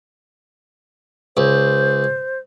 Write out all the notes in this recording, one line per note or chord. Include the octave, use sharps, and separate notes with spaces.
C#2 C5